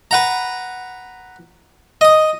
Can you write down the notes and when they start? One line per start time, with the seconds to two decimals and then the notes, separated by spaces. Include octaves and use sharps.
0.11 B4 F#5 A#5
2.01 D#5 D#6